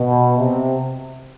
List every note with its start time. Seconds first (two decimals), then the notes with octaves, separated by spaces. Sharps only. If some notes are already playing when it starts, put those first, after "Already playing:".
Already playing: B2
0.38 C3